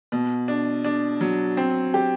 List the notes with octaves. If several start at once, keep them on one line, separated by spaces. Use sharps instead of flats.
B2
D4
D4
F#3
C4
G4